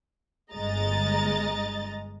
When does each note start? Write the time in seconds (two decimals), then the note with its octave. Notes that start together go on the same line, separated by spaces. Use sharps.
0.53 G1 G#3 D#5 A#5 A6